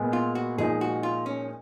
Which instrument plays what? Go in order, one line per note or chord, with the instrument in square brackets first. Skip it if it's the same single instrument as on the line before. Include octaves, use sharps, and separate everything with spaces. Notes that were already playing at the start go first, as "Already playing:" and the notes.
Already playing: [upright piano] A#2 G#3 B3
[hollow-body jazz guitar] F4
F#4
[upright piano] A#2 F3 G#3 D#4 [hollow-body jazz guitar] G#4
[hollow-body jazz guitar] F#4
F4
C#4